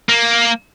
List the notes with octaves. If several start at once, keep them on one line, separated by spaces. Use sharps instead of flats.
A#3